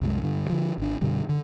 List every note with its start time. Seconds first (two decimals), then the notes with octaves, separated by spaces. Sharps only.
0.01 C2 F#2 F#3 G#3
0.22 G2 D3
0.50 D3 F3
0.78 G#1 D4
1.01 F#2 B2 D3 G3
1.29 D3